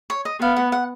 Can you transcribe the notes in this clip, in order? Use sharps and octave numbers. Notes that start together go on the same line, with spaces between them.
C#5
D#5
B3 F5
F#5
F#5